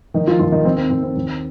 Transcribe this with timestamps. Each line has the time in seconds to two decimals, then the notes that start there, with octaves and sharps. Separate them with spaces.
0.14 D#3 D#4
0.27 F3 F4
0.39 D#2 F3 F4
0.52 D#3 D#4
0.65 D#3 C4
0.77 C4
0.90 D#2 C4
1.03 C4
1.16 D#2